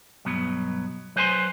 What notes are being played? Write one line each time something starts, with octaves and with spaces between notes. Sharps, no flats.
B1 G2 F#3 B3
F#3 B4 C5 G#5 A5 C6